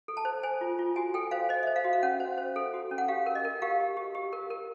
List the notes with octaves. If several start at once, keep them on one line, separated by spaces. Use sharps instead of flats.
A4
A5
C5
C5 G#5
F4
F4
F#4 G#5
A4 G5
C5 F5
C5 D#5
C5 E5
F5
F#4
F5
C#4 F#5
C5
C5
A4
F#4
C#4
F#5
G4 F5
A#4
D#5
A#4
G4 F5
G4
G4
G4
A#4
A#4